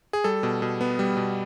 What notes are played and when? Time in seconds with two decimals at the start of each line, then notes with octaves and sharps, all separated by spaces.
0.13 G#4
0.24 G3 A4
0.43 B2
0.62 B2
0.81 B3
0.99 G3
1.17 B2